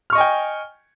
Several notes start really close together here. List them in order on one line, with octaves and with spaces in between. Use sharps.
F6 C#6 D#5 G#5 G5